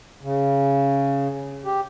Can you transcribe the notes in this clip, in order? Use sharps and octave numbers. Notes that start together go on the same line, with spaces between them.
C#3
G4